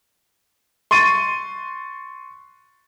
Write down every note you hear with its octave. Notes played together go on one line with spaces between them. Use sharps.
C6 C#6 A6 D#7